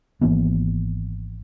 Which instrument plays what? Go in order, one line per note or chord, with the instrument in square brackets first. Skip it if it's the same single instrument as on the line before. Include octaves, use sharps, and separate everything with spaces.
[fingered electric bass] G#1 E3 A#3 B3